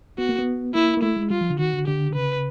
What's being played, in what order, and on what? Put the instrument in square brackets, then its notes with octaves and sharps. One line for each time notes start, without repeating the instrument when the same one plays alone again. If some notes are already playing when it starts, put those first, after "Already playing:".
[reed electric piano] B3 [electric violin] F#4
[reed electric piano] A#3
B3
[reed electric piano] A#3 [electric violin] E4
[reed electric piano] A#3
[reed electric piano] A3 [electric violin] E4
[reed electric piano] G#3
[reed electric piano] G3 [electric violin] F4
[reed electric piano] F3
D3
[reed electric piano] D#3 [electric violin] F#4
[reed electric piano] D3
[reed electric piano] D3 [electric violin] G4
[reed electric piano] D3
[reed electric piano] C#3 [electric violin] B4